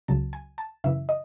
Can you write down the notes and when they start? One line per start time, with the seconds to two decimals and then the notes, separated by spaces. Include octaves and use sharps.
0.08 C#2 C#3 F#3 A5
0.33 G#5
0.58 A5
0.84 F#2 C#3 E3 E5
1.09 D#5